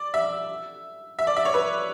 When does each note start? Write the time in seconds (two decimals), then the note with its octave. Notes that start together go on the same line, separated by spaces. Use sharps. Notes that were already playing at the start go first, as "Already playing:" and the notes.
Already playing: D5
0.14 E5
1.19 E5
1.27 D5
1.36 E5
1.45 C#5
1.54 B4